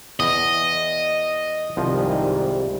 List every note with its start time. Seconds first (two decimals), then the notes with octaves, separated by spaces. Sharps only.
0.20 E2 D#5
1.77 C2 G#2 D#3 F3 G3